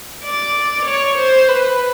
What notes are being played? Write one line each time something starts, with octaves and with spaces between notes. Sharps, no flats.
D5
C#5
C5
B4